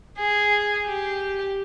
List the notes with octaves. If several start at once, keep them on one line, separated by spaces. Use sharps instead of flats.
G#4
G4